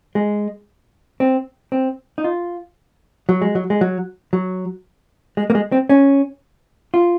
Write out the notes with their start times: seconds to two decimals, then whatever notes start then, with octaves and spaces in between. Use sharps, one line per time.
0.15 G#3
1.20 C4
1.72 C4
2.18 D#4
2.24 F4
3.29 F#3
3.41 G#3
3.55 F#3
3.70 G#3
3.81 F#3
4.33 F#3
5.37 G#3
5.50 A#3
5.55 G#3
5.72 C4
5.89 C#4
6.94 F4